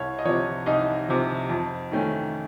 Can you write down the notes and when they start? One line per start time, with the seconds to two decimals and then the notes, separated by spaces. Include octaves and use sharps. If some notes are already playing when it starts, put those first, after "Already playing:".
Already playing: C2 C#5
0.19 D#5
0.25 C3 F3 C#5
0.66 C2 D#4 D#5
1.08 C3 F3
1.49 F2
1.91 D#3 A3 C#4